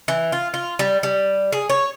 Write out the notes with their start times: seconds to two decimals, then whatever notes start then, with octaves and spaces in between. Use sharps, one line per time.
0.08 E3
0.32 F4
0.54 F4
0.79 G3
1.03 G3
1.52 G#4
1.70 C#5